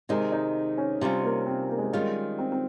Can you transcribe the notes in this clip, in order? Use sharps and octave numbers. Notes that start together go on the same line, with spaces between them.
C3 D#3 G#3 D#4
D#4
C#4
C3 G3 C4 C#4 F4
A#3
C4
A#3
G#3
A#3
D#3 G3 G#3 C#4 F4
C4
C4